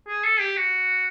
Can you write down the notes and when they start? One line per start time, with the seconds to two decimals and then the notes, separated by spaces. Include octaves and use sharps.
0.08 G#4
0.24 A4
0.40 G4
0.57 F#4